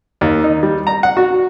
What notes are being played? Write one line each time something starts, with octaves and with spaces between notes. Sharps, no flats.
D#2
D#4
G3
A#5
F#5
F#4